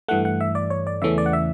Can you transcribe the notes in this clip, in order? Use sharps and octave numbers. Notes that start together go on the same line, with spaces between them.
G2 E3 A3 F#5
F#5
E5
D5
C#5
D5
E2 C#3 E3 A3 C#4 E5
D5
F#5
E5